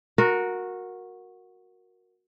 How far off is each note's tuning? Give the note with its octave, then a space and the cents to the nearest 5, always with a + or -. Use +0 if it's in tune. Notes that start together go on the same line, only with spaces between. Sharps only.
F#4 -15 A#4 +0